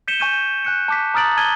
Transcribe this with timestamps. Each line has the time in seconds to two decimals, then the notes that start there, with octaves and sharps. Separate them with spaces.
0.08 G6 B6 C#7 D#7 E7 G7
0.20 G#5 C#6 G6 C#7 D#7
0.65 G#5 F#6 C#7
0.88 A5 D6 B6
1.14 A#5 D#6 F6 A6 D7 F#7
1.37 A5 F6 G#6 D#7 G7